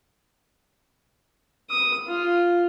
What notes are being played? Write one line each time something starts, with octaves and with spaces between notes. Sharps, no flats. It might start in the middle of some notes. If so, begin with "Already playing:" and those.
D#6
F4